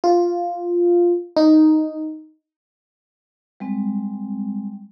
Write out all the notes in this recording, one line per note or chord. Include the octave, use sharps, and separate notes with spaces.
F4
D#4
G3 G#3 C4